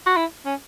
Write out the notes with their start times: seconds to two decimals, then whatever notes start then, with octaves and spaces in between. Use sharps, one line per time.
0.07 F#4
0.16 E4
0.45 C#4